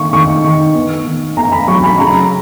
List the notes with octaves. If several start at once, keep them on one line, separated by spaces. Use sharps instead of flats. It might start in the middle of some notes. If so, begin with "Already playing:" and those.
Already playing: D#3 A#3 C#6
D#3 C#6
D#3
B3
D#3
B3 A#5
B5
F#3 C#6
B5
C#3 A#5